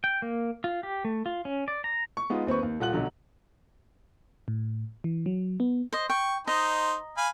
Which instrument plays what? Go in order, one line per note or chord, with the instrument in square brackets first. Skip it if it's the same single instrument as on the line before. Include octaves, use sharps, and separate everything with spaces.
[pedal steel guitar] G5
A#3
F4
G4
A3
F4
C#4
D5
A#5
[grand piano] C#6
G#3 B3 D#4 F4
D#2 C4 B4 C#6
D#2
D#1 F4 F#5 F#6 F#7
B1 D3 F#3
[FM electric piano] A2
E3
F#3
B3
[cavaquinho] C5 D#5
[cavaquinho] G5 [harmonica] C#6
[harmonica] D#4 C5 [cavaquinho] D#5 A#5
[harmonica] F5 G#5 B5